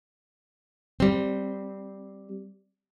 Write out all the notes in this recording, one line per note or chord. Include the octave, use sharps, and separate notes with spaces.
G3 C4